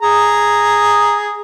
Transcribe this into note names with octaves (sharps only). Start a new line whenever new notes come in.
G#4 A#5